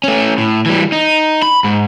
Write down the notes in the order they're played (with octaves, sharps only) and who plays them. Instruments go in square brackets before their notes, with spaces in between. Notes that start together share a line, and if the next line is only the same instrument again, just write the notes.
[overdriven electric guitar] A3 C#4
A2
E3 G3
D#4
B5
G#2